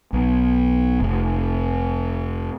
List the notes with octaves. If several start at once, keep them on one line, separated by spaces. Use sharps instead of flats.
B1
F1